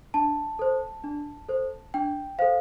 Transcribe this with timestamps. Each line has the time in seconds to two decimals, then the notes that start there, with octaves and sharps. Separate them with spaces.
0.14 D4 A5
0.59 A4 C5
1.04 D4
1.49 A4 C5
1.94 D4 G5
2.39 A4 C5 F5